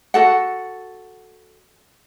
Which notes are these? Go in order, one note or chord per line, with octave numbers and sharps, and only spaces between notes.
F#4 A4 F#5